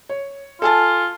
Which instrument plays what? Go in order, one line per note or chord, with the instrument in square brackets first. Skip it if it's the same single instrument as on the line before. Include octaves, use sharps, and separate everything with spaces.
[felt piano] C#5
[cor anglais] F4 [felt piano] A4 G#5 A5